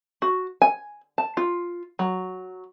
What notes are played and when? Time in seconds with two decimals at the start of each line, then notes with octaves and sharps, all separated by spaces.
0.22 F#4
0.62 G#5
1.18 A5
1.37 F4
1.99 F#3